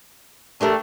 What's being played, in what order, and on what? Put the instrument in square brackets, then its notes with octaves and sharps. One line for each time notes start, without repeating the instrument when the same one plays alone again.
[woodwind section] A3 [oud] D4 G4 A#4